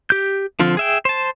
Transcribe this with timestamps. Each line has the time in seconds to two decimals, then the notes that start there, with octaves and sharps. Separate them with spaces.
0.10 G4 G6
0.59 D3 F3 C4 F4
0.77 G#4 E5 G5
1.05 C5 A5